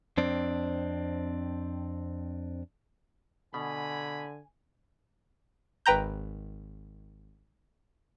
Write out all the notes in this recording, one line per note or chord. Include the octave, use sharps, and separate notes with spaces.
F2 C4 D4
B2 D3 G#5 B5
G#1 B4 G5 A#5 G6